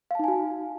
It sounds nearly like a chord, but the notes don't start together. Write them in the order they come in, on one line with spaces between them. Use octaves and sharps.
F5 A5 D#4 G#5 F#4